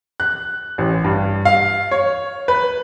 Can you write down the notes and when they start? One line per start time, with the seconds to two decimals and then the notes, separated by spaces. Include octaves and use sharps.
0.20 F#6
0.78 A1
1.04 G2
1.45 F5
1.91 C#5
2.48 B4